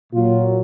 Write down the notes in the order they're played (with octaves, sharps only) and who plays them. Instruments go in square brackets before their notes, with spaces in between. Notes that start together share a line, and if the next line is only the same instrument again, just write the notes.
[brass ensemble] A#2 F#3 F4